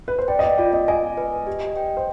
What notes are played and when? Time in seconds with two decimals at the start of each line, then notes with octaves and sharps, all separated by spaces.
0.08 B4
0.19 C5
0.28 D5 G5
0.39 D#5
0.43 D5
0.58 F4 D5
0.73 D#5
0.88 D#5 G#5
1.17 B4
1.47 G4
1.77 G5
1.97 C5